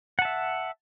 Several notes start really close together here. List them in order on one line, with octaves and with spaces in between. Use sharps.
F#5 A5 E5